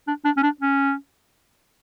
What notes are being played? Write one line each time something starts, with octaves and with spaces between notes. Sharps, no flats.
D4
D4
C#4
D4
C#4